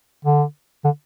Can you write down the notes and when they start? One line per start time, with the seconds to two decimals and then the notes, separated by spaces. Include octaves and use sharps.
0.25 D3
0.85 D3